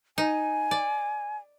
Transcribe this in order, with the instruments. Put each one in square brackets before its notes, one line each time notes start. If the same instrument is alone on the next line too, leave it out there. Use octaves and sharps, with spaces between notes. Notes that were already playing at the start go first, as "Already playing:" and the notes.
[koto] D#4 [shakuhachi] G#5
[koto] D5